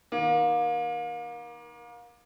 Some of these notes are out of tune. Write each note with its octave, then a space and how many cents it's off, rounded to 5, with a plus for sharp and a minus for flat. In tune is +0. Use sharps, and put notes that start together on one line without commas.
D#3 +5 A#3 +30